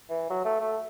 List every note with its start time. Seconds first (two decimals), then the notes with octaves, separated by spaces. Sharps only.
0.10 E3
0.30 F#3
0.45 A3
0.60 A3